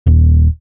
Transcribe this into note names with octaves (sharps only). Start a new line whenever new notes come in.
D#1